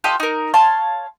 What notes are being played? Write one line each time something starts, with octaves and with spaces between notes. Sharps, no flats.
F4 G4 A4 D#5
D#4 A#4
C#5 F5 A5 C6